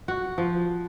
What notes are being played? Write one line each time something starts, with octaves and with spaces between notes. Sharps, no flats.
F#4
F3